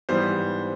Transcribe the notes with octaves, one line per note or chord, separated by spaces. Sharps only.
G#2 E3 G3 B3 C5